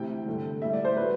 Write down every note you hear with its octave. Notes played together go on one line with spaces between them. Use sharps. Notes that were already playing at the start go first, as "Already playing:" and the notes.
Already playing: D2 C3 E3 G5
G2 D3 A3
A2 G3 E5
D5
C5
F#3 A3 B4